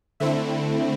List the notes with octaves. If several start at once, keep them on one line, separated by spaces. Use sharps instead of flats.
D3 A3 C4 E4 E5